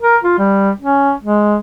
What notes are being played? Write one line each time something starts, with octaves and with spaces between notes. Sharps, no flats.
A#4
F4
G3
C#4
G#3